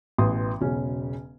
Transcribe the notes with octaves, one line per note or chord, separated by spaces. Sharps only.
A1 B2 E3 C6 D#6
E1 B1 C#3 C#4